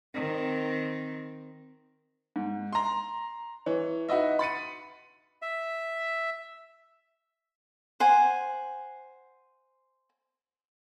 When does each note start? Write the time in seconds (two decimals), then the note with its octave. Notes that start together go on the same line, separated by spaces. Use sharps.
0.14 D#3 C4
2.36 G#2
2.73 A#5 C6
3.66 E3 C#5
4.09 D#4 F#4 B4 D#5 E5
4.39 B5 A6 C#7 D#7
5.42 E5
8.00 C5 F#5 G#5